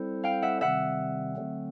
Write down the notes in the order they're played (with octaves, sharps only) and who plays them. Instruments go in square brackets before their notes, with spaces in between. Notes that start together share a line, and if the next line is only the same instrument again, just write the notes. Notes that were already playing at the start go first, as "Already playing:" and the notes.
Already playing: [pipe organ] G3 C4 E4 A4 C5
[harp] F5 G5
E5 F#5
[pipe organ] C3 D#3 G3 C4 [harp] E5 F#5
[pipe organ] D3 F#3 A3 C4